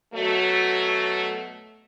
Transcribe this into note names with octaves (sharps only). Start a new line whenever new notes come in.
B2 F#3 A3